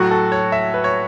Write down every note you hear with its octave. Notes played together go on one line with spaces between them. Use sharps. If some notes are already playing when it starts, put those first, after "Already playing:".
Already playing: A2 F#3 F#4
A4
C#5
E5
B4
C#5